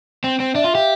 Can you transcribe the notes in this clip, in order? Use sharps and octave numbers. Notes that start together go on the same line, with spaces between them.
C4
C4
D4 E5
F4 F5
G4 E5